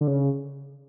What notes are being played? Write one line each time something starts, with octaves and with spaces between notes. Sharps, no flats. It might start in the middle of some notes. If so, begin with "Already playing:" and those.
D3
C#3